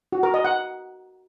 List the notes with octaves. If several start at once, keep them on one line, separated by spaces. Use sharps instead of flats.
F#4
A#4
D#5
F#5